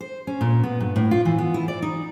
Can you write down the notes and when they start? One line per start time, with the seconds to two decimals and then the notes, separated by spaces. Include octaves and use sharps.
0.01 C5
0.27 C#4
0.41 A#2
0.64 B3
0.80 G2
0.96 A2
1.11 F4
1.25 E3
1.38 B3
1.54 E4
1.68 D5
1.82 D#4